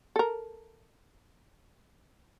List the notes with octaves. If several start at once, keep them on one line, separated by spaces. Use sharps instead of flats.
A4 A#4